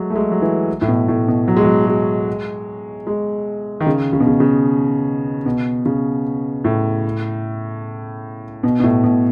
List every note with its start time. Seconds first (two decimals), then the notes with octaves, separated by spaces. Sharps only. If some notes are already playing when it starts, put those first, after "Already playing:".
Already playing: F#3 G#3 A3
0.10 A3
0.15 G#3
0.31 F#3
0.42 E3
0.81 A2
0.88 B2
1.08 A2
1.28 B2
1.48 F#3
1.57 G#3
1.65 F#3
1.87 G#3
3.07 G#3
3.80 D#3
3.87 C#3
4.13 C#3
4.20 B2
4.27 C#3
4.40 C#3
5.46 B2
5.86 C#3
6.64 A2
8.63 B2
8.80 B2
8.83 A2
9.04 B2